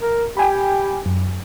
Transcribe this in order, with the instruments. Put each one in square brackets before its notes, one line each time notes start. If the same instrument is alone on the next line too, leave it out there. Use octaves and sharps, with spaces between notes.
[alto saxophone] A#4
[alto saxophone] G4 [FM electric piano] G5 G#5 B5
[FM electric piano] F#2